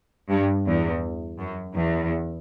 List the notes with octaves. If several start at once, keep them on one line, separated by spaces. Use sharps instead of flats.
G2
E2
F#2
E2